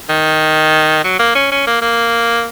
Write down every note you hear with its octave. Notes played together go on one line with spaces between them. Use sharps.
D#3
F#3
A#3
C#4
C#4
A#3
A#3